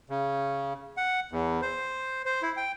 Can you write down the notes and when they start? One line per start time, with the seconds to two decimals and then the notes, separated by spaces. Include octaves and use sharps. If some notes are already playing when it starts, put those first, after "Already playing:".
0.09 C#3
0.97 F#5
1.32 E2
1.62 C5
2.26 C5
2.42 E4
2.57 G5